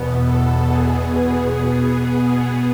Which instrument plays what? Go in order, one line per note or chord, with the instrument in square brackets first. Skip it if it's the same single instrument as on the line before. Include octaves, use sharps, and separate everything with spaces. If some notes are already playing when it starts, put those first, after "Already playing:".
Already playing: [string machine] E2 B2 B3
A4
G#4
B2 B3